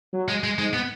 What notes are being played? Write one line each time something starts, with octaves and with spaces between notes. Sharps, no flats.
F#3
G#3
G#3
G#2 G#3
B3